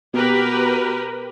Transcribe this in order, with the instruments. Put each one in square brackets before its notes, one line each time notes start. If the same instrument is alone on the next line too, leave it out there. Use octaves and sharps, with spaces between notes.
[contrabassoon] B2 [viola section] G4 A#4 B4